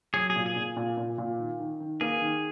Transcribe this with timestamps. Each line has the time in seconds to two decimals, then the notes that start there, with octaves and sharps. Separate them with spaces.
0.14 F#3 G#4
0.30 G#4
0.36 A#2
0.46 G#4
0.56 A#2
0.76 A#2
0.97 A#2
1.18 A#2
1.39 D#3
1.60 D#3
1.80 D#3
2.01 A#3 G#4
2.21 D#3